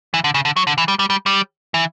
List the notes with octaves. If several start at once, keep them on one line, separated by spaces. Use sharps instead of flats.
E3
D3
C#3
D3
F#3
D3
E3
G3
G3
G3
G3
E3